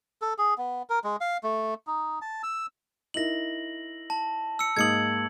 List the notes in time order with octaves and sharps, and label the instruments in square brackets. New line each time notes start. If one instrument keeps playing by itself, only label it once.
[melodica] A4
G#4
B3
A#4
G#3
F5
A3
D#4
A5
E6
[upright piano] D#4 E4 A#4 [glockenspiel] A#6 F#7
[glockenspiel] A5
E6 C#7
[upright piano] G#2 A#3 D#6 [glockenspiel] G#6 C#7 F#7